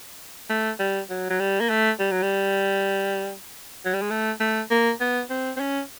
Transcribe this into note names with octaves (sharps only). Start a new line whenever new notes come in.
A3
G3
F#3
F#3
G3
A#3
A3
G3
F#3
G3
F#3
G3
G#3
A3
A3
A#3
B3
C4
C4
C#4